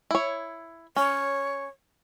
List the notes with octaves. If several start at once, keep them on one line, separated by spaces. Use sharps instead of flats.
E4 C#5
C#4 C#5